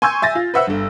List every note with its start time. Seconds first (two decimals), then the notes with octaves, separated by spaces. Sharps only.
0.02 G#5 C6 C#6 E6 G6 G#6
0.22 E5 G#5 A6 A#6
0.35 F4
0.54 B4 C5 E5 F#5 E6
0.67 G1 G2